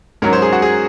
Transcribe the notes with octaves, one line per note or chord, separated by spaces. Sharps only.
G#2 F#3 C#4 A#4
C5
G#4
F#4
G#4